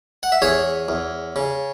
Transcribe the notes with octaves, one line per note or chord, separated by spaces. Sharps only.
F#5
E5
E2 G#4 C#5
E2
C#3